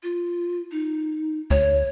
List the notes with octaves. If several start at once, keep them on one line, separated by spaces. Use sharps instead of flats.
F4
D#4
D2 C#5